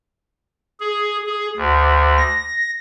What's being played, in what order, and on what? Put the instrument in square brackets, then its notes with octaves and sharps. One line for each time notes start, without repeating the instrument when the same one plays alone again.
[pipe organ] G#4
G#4
D2
A#6